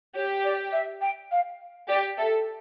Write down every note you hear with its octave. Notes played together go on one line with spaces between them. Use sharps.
G4 C#5
D5
E5
G5
F5
G4 D5
A4 E5